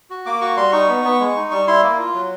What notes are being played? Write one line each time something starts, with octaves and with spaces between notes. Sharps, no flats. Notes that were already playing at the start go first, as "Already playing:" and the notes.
F#4
A#3 D6
F#4 C#6
G3 C6
D#4 C#6
B3
B3
G#3
D#4
G3 C#6
E4 C6
A#3
F4
F#3